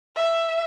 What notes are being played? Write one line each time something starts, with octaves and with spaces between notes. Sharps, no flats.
E5